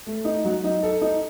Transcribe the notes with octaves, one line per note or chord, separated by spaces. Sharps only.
A3
D#4
F#3
D#4
A4
D#4